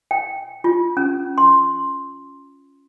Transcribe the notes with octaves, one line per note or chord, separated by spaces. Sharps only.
G5
F4
C#4
C6